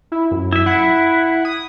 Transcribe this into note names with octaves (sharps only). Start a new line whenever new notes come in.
E4
F#2
E4 E5
E4 F#5
D#6